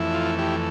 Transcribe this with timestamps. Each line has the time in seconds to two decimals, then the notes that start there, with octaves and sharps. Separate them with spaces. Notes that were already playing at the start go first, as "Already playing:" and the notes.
Already playing: F2 E3 A3 E4
0.14 F4
0.39 E4 G4